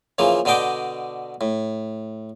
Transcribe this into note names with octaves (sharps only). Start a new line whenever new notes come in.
C#3 E3 F3 A#3
B2 D3 D4 D#5 G5 D6
A2